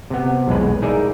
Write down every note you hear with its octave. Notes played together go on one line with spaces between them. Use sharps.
C3 B3
B1 E2 G#3 B4
D#4 G#4 A#4 D5 E5